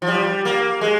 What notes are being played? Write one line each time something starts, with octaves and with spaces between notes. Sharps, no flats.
F3
G3
A#3
G#3